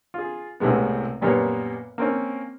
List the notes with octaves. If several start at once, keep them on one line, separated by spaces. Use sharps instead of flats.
F4 G#4
C2 A2 C3 G#3 B3
F#2 A#2 G3 A#3 B3 C#5
A#3 C4 C#4